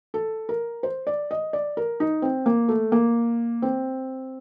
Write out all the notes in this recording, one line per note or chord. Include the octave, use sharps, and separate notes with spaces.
A4
A#4
C5
D5
D#5
D5
A#4
D#4
C4
A#3
A3
A#3
C4